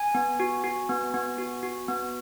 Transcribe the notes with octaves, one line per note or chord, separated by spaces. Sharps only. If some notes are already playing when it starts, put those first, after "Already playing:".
Already playing: G#5
B3
F#4
F#4
B3
B3
F#4
F#4
B3